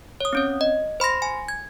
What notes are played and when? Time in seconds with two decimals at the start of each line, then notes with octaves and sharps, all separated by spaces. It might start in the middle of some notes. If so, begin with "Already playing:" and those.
0.20 C#5 D#6
0.33 C4 C#4 C#5
0.61 D#5
1.00 C5 B5 C6 A#6
1.22 G#5
1.48 G#6